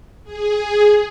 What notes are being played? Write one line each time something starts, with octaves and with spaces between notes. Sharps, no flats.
G#4